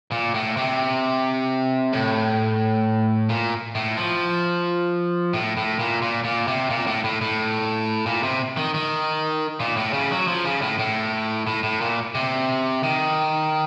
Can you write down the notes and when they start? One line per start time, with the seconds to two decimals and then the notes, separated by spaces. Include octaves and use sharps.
0.12 A#2
0.34 A2
0.57 C3
1.93 A2
3.29 A#2
3.75 A2
3.97 F3
5.34 A2
5.57 A2
5.79 A#2
6.02 A#2
6.24 A#2
6.47 C3
6.70 A#2
6.87 A2
7.04 A2
7.21 A2
8.06 A#2
8.23 C3
8.57 D#3
8.74 D#3
9.60 A#2
9.77 A2
9.93 C#3
10.11 F#3
10.28 F3
10.45 C#3
10.62 A2
10.79 A2
11.47 A2
11.63 A2
11.81 A#2
12.15 C3
12.83 D#3